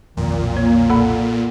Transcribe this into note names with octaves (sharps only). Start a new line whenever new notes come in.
B1 F2 A#2 D#3
A#3 C#5
A4 F#5 B5